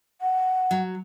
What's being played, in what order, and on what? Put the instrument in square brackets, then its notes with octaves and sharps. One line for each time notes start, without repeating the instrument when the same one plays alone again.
[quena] F#5
[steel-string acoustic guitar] F#3